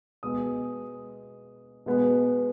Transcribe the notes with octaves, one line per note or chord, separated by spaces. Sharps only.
B2 G#3 B3 D#6
B2 G#3 B3